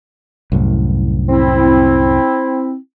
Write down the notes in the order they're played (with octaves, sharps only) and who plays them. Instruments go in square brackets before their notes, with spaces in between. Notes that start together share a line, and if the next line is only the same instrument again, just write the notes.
[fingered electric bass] C2 F#2 A2
[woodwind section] C4 E4